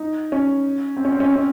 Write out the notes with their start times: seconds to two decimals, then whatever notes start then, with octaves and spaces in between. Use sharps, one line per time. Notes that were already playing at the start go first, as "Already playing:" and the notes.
Already playing: D#4
0.32 C#4
0.97 C4
1.05 C#4
1.12 C4
1.20 C#4
1.28 C4
1.36 C#4